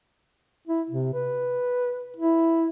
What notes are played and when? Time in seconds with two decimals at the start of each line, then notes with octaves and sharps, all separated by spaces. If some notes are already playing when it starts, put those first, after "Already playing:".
0.67 E4
0.90 C3
1.13 B4
2.16 E4